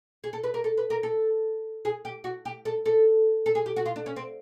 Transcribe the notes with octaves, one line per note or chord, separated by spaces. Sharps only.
G#4
A4
B4
A#4
A4
B4
A#4
A4
G#4
G4
F#4
G4
A4
A4
A4
G#4
G4
F#4
F4
D4
C#4
C4